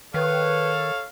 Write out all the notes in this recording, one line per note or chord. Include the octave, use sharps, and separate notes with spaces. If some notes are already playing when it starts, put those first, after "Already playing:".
D#3 A4 B4 C#5 F5